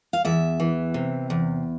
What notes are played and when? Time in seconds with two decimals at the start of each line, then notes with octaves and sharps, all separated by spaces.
0.13 F5
0.25 E2 E5
0.60 E3
0.94 C3
1.30 E2